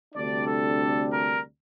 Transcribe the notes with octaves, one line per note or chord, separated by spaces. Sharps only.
D2 C3 G3 D4 D5
A4
A#4